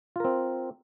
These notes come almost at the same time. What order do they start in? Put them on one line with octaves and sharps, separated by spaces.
F4 A#4 C4